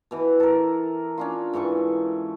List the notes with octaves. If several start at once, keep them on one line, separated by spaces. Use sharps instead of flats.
B2 E3
A4 A#4
C#4 D4 F4
G#2 E3 A4 C#6